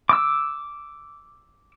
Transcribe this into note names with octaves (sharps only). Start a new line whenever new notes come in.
D6 E6